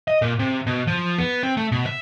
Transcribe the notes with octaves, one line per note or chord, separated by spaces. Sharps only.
D#5
A#2
C3
B2
F3
B3
C4
A3
B2
E5